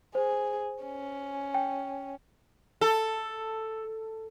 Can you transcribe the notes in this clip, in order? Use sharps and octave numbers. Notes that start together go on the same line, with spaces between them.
G#4 C5
C#4
G5
A4